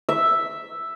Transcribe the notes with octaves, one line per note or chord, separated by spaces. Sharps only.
E5